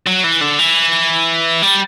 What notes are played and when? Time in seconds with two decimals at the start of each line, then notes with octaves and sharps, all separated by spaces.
0.07 F#3
0.23 E3
0.41 D3
0.59 E3
1.63 G3